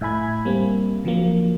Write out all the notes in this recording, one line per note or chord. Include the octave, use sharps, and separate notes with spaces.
A2 E5 G#5 B5 G#6
G3 A#3 C4
D3 F3 F#3 A#3